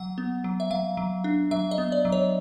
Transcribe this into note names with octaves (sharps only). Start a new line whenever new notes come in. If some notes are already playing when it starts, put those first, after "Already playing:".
Already playing: F#3 F#5
B3
F#3
E5
F#3 F5
F#3
D4
F#3 E5
D#5
B3
D5
F#3
C#5